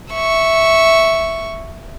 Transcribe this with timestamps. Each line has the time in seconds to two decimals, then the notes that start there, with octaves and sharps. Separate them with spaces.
0.13 E5 C#6